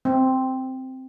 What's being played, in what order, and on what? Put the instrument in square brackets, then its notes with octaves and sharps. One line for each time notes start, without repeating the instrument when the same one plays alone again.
[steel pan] C4